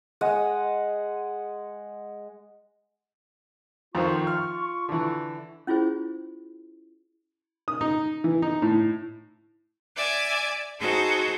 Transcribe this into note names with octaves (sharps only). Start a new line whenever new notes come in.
G#3 D#5 F#5
F2 D#3 F4 C5 C#6
F6
D3 E3
C#4 E4 F4 G#4 C5
D#6
D#4
E3
D#4
A2
D5 E5 G#5
D#4 F#4 G#4 A4 C5